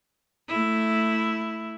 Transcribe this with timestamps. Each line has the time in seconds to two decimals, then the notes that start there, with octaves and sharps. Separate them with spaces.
0.48 A3 E4